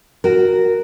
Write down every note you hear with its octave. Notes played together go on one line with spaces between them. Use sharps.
F#4 A#4